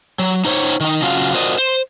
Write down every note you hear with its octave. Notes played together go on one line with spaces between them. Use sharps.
F#3
D#4 C5 C#5
D#3 D#4
C#3 F#3 F4 F#4 F5
F4 F#4 A#4 C5 D5 D#5
C5